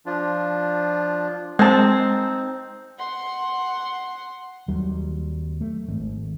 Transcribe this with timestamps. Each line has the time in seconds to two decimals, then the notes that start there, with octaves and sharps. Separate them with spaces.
0.06 F3 D4 F4
1.59 G#3 C4 D#4 A5
2.99 F#5 C6
4.68 D#2 F#3 G3
5.61 A3
5.88 G#1